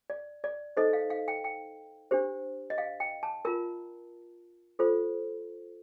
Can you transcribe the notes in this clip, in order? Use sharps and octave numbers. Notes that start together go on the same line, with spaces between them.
D5
D5
D#4 A4 C5 D#5
F5
F5
G5
G5
D4 G4 C5
D#5
F5
G5
A5
F4 A#4 A#5
F4 A4 C5